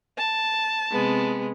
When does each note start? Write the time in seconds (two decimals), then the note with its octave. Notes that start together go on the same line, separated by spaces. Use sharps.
0.17 A5
0.91 C3 G#3 B3